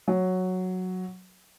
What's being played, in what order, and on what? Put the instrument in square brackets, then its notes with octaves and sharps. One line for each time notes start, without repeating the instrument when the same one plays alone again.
[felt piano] F#3